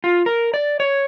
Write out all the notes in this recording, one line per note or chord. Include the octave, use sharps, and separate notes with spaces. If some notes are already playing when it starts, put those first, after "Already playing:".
F4
A#4
D5
C#5